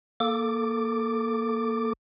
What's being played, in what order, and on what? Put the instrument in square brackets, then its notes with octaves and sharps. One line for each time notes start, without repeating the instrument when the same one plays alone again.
[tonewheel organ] A#3 A4 D6